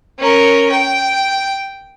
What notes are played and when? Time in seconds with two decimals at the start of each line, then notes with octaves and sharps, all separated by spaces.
0.19 C#4 A#4
0.72 G5